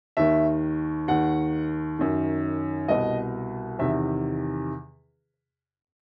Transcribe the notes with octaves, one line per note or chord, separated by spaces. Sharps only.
D#2 D#3 E5
D#2 D#3 F#5
F#2 D#3
C2 B2 D#5
E2 C3 D#3 E5